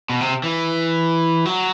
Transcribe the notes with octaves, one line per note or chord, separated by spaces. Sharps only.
B2
C3
E3
F#3